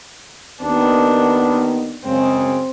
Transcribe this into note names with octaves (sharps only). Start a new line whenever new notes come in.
D#2 D#3 B3 D4
F#2 C#3 G#3 C4